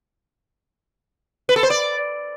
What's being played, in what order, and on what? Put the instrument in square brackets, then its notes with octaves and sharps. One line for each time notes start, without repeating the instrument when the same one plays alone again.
[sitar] B4
A4
C5
D5